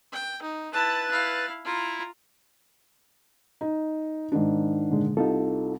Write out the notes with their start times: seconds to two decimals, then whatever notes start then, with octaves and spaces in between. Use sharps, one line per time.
0.13 G5
0.42 D#4
0.73 E4 B4 A5 F#6 A6
1.11 E4 F5
1.65 E4 F4 A#5
3.61 D#4
4.32 G#2 D#3 D4
4.90 A#2 D3 G#3
5.17 C2 D#4 F4 A4